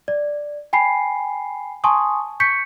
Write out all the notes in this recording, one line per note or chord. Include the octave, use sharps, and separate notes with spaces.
D5
G5 G#5 B5 C7
G#5 A5 C6 C#6 D#6
C#6 G6 B6 C#7